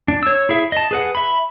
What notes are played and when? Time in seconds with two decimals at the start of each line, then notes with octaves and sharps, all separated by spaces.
0.08 D4
0.23 C#5 E6
0.49 E4 G#4 E5
0.72 D#5 A5
0.91 G#4 B4 F#5
1.15 E5 B5